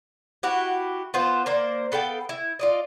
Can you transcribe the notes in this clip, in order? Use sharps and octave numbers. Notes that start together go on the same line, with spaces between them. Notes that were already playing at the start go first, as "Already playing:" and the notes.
E4 F#4 G4
B3 F4 C5
A#3 C5 D5
B3 A4 F5 G5
E4
F4 D5 D#5